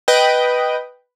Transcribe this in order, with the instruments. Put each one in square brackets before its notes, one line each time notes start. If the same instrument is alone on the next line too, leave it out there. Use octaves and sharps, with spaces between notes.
[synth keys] B4 D#5 G5 D#6